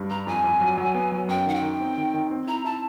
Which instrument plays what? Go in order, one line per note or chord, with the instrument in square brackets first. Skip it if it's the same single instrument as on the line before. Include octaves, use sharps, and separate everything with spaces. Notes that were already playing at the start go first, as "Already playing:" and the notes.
Already playing: [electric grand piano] G2 G3
[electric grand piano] G2 [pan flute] A#5
[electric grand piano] F2 [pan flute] G#5
[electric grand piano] F2
F#3
F#3
B3
F#3
[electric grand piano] F#2 [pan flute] G5
[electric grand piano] D#3 [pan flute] F#5
[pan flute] G5
[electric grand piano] D#3
C4
D#3
D#3
C4
[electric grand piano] E4 [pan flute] A#5
[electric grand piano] E4 [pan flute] A5